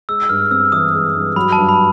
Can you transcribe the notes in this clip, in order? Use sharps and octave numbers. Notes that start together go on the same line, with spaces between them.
G#3 E6
G2 F6
C4 E6
E3 D#6
G#3
G2
F#3 B5
A5
G2
B5